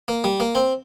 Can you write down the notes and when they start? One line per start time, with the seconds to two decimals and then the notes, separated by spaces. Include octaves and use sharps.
0.08 A#3
0.24 G3
0.40 A#3
0.55 C4